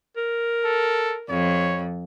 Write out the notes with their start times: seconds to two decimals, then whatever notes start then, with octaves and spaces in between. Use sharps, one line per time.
0.17 A#4
0.65 A4
1.30 F2 C#5